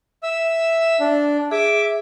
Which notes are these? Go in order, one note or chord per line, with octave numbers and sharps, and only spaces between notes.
E5 E6
D4
G#4 E5 D6